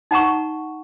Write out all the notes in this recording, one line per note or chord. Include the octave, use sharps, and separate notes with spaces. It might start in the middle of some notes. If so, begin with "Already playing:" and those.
D#4 F#5 A#5 C#6